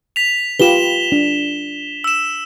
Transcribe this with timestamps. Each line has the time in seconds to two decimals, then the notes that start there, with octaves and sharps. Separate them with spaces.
0.16 B6 F7
0.60 F4 G4 B4 E7 G7
1.12 D4
2.04 E6 E7